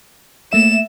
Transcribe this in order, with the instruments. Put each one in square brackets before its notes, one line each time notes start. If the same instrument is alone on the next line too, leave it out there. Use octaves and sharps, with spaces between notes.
[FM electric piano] A3 A#3 E5 [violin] E7